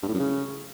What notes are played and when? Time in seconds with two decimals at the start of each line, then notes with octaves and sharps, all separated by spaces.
0.03 G2
0.08 A2
0.14 F#2
0.20 C#3